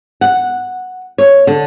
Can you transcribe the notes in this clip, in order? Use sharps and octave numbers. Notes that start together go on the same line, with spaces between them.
F#5
C#5
D3